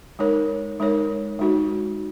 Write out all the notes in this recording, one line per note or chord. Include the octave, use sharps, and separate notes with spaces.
G#3 D#4 A#4 C#5
G#3 D#4 A#4 C#5
G#3 D#4 F#4